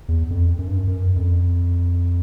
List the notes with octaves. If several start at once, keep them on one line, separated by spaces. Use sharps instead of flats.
E2
F2
F#2
G2
F#2
F#2
F2